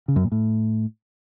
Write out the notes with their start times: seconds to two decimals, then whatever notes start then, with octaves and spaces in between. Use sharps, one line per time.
0.08 C#3
0.16 F#2
0.24 A#2
0.32 A2